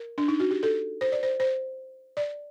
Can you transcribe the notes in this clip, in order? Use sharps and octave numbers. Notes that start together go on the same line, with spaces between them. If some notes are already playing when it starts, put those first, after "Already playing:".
Already playing: A#4
D4
D#4
F#4
G4
A4
C5
D5
C5
C5
D5